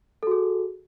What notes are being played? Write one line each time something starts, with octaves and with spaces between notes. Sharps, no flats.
F#4 G#4 A4